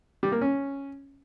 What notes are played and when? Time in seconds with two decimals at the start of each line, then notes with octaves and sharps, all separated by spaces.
0.23 G3
0.32 A#3
0.41 C#4